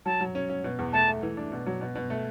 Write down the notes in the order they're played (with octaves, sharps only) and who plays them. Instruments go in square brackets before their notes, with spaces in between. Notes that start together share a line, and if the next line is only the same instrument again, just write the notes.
[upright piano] F#3 [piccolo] A5
[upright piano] F#3
C#4
C#4
B2
E2
[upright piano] A3 [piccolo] A5
[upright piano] A3
E3
D4
B2
F#3
B2
B2
A3